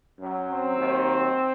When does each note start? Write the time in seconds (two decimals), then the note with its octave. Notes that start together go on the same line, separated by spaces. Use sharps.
0.20 F#2 F#3
0.49 C4
0.77 D#2 D#3 F#3